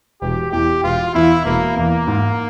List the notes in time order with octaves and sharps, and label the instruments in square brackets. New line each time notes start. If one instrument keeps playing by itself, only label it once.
[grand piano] E1 [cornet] G4
[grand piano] E2 E3 [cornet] G4
[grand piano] E1 [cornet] F4
[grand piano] E2 E3 [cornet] E4
[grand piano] E1 [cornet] A#3
[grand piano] E2 E3 [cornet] A#3
[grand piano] G#2